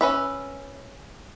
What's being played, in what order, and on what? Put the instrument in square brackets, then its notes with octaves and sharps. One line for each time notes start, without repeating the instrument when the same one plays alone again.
[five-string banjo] C#4 B4 E5